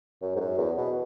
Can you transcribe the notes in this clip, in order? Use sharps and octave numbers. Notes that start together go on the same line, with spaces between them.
F#2
G#2
F#2
E2
B2